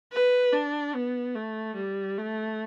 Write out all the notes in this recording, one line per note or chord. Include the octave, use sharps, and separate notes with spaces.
B4
D4
B3
A3
G3
A3